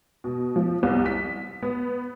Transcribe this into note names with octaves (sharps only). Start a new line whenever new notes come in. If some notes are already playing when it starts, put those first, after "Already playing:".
B2
F3
C2
B6
B3